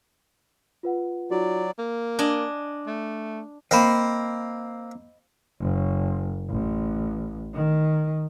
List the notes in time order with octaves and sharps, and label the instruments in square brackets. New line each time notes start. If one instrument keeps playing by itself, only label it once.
[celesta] F4 B4 F#5
[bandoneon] F#3 D5 [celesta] D#4 F4 F#4
[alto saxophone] A#3
[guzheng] D4 D#5 G#5
[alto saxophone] A3
[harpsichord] A#3 C4 [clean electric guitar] D#5 B5
[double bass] F#1
A1
D#3